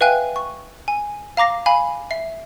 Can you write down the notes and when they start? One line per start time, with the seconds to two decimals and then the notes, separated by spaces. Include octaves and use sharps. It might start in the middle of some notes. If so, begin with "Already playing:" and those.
0.01 B4 E5 F5 G5 G#5 F#6
0.36 C#6
0.88 G#5
1.37 F5 A#5 D6 A#6 C7
1.66 F5 G#5 B5
2.11 E5 C7